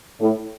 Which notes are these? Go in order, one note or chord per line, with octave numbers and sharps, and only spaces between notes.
A2